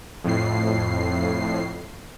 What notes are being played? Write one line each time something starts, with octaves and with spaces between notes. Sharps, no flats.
F2 A2 C7